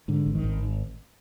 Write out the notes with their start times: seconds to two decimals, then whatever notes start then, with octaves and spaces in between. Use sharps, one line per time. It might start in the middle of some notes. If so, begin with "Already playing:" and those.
0.08 G#2 D3
0.26 G#1
0.35 D#3
0.44 G#1